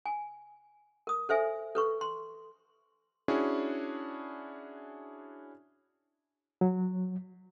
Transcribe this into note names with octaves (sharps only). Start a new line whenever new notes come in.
G#5
A#4 D#6
A4 C5 E5 G#5
A4 B4 C#6
C6
C#4 D4 E4 F#4 G#4
F#3